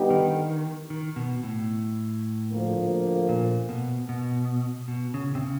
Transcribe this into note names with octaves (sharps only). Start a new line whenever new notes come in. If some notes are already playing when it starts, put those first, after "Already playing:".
Already playing: D3 G3 B3 D#4 G4
D#3
D#3
B2
A2
D2 D3 F3 A#3
A#2
B2
B2
B2
C#3
C3
C#3